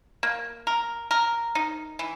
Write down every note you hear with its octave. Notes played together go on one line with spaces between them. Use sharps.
A#3
A#4
A#4
D#4
E3